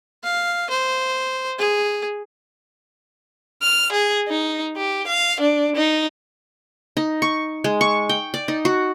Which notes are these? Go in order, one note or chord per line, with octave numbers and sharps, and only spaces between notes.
F5
C5
G#4
F6
G#4
D#4
G4
F5
D4
D#4
D#4
C#6
G#3
C#6
G5
D5
D#4
F#4